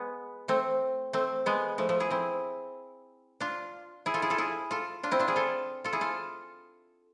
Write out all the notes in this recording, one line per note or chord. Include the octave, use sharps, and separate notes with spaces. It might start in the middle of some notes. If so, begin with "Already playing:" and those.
Already playing: G#3 B3
A3 C4
A3 C4
G#3 B3
F3 A3
F3 A3
E4 G#4
C4 E4
D4 F4
E4 G#4
F4 A4
E4 G#4
F4 A4
E4 G#4
F4 A4
D4 F4
C4 E4
D4 F4
E4 G#4
F4 A4
F4 A4
E4 G#4
F4 A4